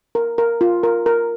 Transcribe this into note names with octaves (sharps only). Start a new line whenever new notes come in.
A#4
A#4
F4
A#4
A#4